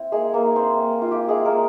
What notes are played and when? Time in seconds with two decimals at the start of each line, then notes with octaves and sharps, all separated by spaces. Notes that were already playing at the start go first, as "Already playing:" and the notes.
Already playing: C4 E4
0.12 G#3 A#3 G#4
0.34 A#3 A#4
0.45 E4
0.56 C4 C5
0.78 A#3
1.02 F4
1.11 E4 G4
1.29 G#3 G#4
1.45 G#3 A#3 A#4